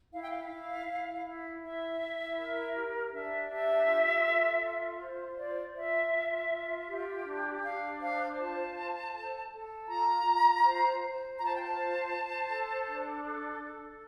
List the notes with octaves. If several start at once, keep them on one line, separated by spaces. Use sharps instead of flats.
E4 F5
G5
F5
E4
E4
E4
E4 E5
E4
A#4
G4
D4 E5
G4 E5
F4
A4
F4
C5
F4 D5
F4 E5
F4
F4
G4
D4
D4 F5
C5 F5
F4 A5
C5
A4
A4
F4 A#5
F4
C5
C5
F4 A#5
A5
G5
A5
C5
C5
A4
D4
A4
A4